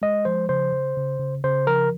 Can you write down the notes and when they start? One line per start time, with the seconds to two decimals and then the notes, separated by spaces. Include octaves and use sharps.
0.02 G#3 D#5
0.25 F3 C5
0.49 C#3 C5
0.73 C#3
0.97 C#3
1.20 C#3
1.44 C#3 C5
1.67 F3 A#4